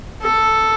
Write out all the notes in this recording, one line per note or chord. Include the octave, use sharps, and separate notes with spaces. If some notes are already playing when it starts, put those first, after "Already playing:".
A4